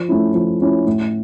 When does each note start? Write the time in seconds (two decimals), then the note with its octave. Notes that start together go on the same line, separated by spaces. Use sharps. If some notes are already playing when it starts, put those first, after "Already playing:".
Already playing: F3
0.09 A3 C#4 E4
0.34 F3
0.61 A3 C#4 E4
0.87 A2